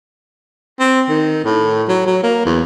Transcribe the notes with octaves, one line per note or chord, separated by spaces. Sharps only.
C4
D#3
A2
F#3
F#3
A#3
E2